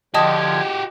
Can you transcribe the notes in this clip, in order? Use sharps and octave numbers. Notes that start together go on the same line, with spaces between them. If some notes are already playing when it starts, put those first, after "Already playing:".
D3 F3 F#4 G4 D#5 A5 D#6 G#6